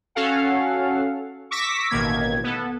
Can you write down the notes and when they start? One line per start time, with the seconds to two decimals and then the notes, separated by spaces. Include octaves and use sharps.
0.15 C#4 F#4 A4 F5 F#5
1.51 C#6 D6 E6 A#6 B6
1.90 A1 B2 D#3 A#3 G#6
2.43 B3 A4